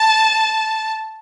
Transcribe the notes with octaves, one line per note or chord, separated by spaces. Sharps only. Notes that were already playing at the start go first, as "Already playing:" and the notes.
Already playing: A5